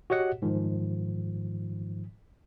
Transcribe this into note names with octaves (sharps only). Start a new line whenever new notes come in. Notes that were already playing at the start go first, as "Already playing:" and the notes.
F#4 G4 C#5 D#5 F#5
G#2 D#3 F3